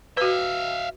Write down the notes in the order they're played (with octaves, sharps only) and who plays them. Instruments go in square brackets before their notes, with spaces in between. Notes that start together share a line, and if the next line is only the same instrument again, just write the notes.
[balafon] F#4 B4 [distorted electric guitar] E5 F5